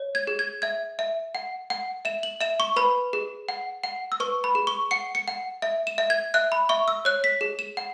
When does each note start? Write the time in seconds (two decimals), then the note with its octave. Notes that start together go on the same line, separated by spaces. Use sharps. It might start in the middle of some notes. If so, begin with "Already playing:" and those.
Already playing: C#5
0.15 G#6
0.27 G#4
0.39 G#6
0.62 E5 G#6
0.99 E5
1.35 F#5
1.70 F#5
2.05 E5 E7
2.23 F#7
2.41 E5 E7
2.60 C#6
2.76 B4 B5
3.13 G#4
3.49 F#5
3.84 F#5
4.12 E6
4.20 B4 C#6
4.44 B5
4.55 G#4
4.67 C#6
4.91 F#5 C#7
5.15 C#7
5.28 F#5
5.62 E5
5.87 E7
5.98 E5
6.10 G#6
6.34 E5 F#6
6.52 B5
6.69 E5 C#6
6.88 E6
7.05 C#5 F#6
7.24 B6
7.41 G#4
7.59 E7
7.77 F#5